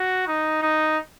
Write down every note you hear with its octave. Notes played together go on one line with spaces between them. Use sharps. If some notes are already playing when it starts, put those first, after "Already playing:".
Already playing: F#4
D#4
D#4